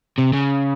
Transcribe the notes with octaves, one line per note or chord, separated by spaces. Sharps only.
C3
C#3